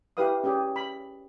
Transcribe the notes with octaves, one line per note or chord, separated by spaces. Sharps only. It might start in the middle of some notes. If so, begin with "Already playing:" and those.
E4 G4 B4 F5 D#6
C#4 G4 G#4
B5